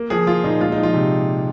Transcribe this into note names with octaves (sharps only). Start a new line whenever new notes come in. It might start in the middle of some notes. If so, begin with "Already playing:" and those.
Already playing: A#3
F3 G#4
A#3 F4
A#2 D#4
G#3 F4
D#4
F3
F4
C3